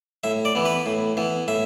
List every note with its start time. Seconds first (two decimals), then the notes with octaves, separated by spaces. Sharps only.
0.24 A2 E5
0.45 D5
0.55 E3 B3
0.65 B4
0.86 A2
1.17 E3 B3
1.48 A2 E5